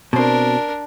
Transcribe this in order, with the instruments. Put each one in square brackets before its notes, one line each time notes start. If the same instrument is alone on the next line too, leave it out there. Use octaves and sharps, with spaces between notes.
[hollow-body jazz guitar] B2 C4 [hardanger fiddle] D4 A#4